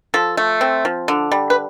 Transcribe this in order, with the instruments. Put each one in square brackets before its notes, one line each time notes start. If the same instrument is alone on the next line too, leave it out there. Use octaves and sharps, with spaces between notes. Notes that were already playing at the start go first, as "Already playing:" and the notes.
[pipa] F3 A4
A3
C4
F3
D3
G3
B4